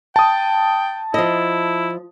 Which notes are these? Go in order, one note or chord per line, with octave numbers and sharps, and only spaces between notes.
G5 A5 D#6
F3 E4 D#5